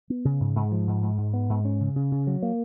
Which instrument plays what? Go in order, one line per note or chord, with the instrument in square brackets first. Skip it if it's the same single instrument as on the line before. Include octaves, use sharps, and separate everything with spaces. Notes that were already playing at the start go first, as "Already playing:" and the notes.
[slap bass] B3
C#3
G#2
G#2
F3
G#2
G#2
G#2
B3
G#2
C#4
C#3
C#3
C#3
F#3
A#3